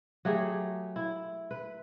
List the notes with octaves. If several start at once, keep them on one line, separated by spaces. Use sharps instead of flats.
F#3 A3 G4 G#4
E4
B4